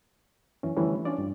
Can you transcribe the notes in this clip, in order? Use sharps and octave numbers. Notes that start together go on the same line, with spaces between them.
F#2 E3 C#4
D3 E3 F3 G3 A3 C#4
C#4 D4 F4 D5
G2